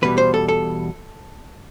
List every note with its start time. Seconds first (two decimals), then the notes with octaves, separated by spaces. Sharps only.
0.02 E2 B2 G3 B4
0.18 C5
0.34 A4
0.48 A4